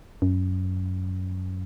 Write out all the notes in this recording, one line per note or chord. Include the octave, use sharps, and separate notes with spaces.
F#2